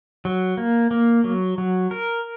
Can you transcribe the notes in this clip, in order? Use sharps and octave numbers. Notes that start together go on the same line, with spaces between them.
F#3
A#3
A#3
F#3
F#3
A#4